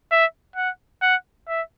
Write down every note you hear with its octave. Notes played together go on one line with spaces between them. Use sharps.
E5
F#5
F#5
E5